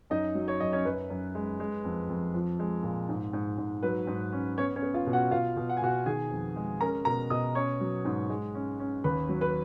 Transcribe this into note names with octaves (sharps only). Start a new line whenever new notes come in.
F#2 D#4 D#5
F#3
C#5
F#2 D#5
C#4 C#5
F#2 B4
F#2
G#3
G#3
F2
F2
F3
G#3
A#2
G#2
G#2
G#2
F#3 B4
G#2
C#4
B3 C#4 C#5
C#4 C#5
B3
F4 F5
B2
F#4 F#5
B2 F4 F5
B2
F#5
G#5
B2 F#4 F#5
D#3 G#4 G#5
F2
G#3
C#4 A#4 A#5
B2 A#4 A#5
B2 D#5 D#6
C#4 C#5 C#6
F#3
G#2
G#3
C#4
C#4
D#2 B4 B5
F#3
B4 B5